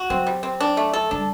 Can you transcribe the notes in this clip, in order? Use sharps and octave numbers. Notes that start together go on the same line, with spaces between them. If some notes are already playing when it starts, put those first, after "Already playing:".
Already playing: F#4
F#3 C4
G3
C4
D4
A3
A4
G3 D4